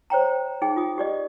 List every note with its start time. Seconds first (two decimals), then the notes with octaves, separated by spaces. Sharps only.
0.10 C5 C#5 G5 A#5
0.62 D#4 G#4 G5
0.76 F4 D#6
0.98 G4 D5 D#5